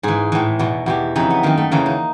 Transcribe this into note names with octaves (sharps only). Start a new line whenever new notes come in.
G#2 E3 G#4
A2 E3
E2 B2
E2 B2 G4
F2 C#3 E3 D#4
B3
F#2 D#3 A#3
A3
E2 C#3 E3 A#3
D#4